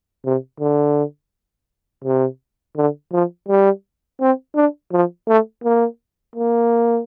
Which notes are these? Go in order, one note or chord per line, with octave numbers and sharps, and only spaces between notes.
C3
D3
C3
D3
F3
G3
C4
D4
F3
A3
A#3
A#3